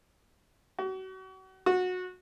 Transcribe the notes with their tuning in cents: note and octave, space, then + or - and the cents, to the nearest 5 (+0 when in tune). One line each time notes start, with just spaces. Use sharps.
F#4 +35
F#4 -20